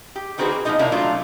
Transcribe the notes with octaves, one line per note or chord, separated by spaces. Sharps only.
G4
D3 D#3 C4 F#4 G#4 B4
A#3
B2 F3 G#3 A#3 D#4 D#5
C3 D#3 A#3 D4 E4
F#3 A3 D4 F4